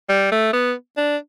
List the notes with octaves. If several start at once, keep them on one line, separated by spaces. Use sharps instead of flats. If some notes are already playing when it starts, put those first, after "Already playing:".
G3
A3
B3
D4